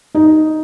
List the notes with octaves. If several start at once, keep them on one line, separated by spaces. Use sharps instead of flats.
D#4